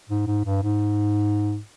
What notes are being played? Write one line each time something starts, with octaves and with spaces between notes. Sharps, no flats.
G#2
G#2
G2
G#2